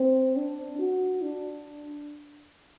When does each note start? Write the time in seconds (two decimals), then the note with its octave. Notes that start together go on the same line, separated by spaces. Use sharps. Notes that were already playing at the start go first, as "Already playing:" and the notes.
Already playing: C4
0.36 D4
0.79 F#4
1.22 D4